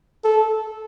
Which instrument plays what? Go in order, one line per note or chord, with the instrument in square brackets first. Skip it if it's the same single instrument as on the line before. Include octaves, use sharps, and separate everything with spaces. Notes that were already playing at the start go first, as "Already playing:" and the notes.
[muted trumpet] A4